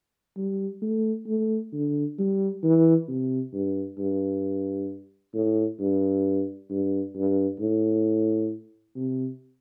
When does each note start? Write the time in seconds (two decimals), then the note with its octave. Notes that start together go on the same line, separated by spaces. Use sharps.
0.37 G3
0.82 A3
1.27 A3
1.73 D3
2.18 G3
2.63 E3
3.08 C3
3.53 G2
3.98 G2
5.34 A2
5.80 G2
6.70 G2
7.16 G2
7.60 A2
8.96 C3